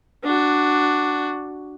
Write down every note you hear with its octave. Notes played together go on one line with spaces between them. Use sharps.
D4 F#4